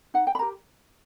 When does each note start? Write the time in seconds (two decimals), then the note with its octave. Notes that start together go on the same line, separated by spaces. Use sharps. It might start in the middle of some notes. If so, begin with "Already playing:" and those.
0.14 D#4 F#5
0.27 G5
0.35 B5
0.39 G4 A#4 A#5